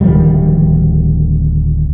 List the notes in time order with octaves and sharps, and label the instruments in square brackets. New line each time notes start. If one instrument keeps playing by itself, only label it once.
[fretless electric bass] D1 D#3 F3 G3